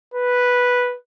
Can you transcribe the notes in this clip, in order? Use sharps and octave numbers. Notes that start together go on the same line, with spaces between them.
B4